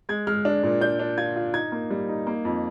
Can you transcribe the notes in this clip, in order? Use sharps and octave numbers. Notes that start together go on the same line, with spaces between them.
G#3 G#6
G#3 F6
D4
A#2
D4 G6
D4
F4 G#6
F4
D#4 G#6
A#3
G3
D#4
A#3
F2